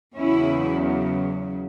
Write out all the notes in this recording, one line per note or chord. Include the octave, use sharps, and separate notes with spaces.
E2 C#3 F#3 C#4 E4